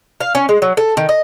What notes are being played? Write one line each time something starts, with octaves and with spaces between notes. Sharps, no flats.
F5
C#4
G#3
F#3
A4
D#3
D#5